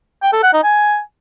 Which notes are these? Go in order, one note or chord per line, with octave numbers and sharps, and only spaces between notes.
G5
A4
F#5
D#4
G#5